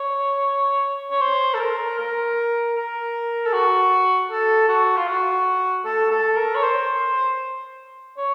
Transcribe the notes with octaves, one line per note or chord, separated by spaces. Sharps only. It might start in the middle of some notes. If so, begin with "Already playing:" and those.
Already playing: C#5
C#5
C5
A4
A#4
A#4
A#4
A4
F#4
A4
F#4
F4
F#4
A4
A4
A#4
C#5
C5
C#5